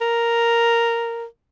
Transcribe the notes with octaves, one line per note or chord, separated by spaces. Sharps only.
A#4